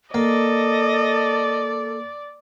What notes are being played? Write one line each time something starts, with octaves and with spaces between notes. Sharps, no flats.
A#3 A4 D5 D#5